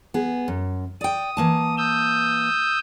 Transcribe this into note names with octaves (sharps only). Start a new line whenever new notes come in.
B3 G#4
F#2
D5 G5 D#6
E3 A#3 A5
D#6 E6 G6